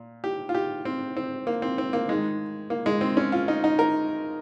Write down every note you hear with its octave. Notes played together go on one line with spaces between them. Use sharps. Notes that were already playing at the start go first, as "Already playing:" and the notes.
Already playing: A#2
G4
F4
G4
C4
C4
A#3
C4
C4
A#3
G#2 D#3 G#3
A#3
G#3
C4
C#4
F4
D#4
D#4
A#4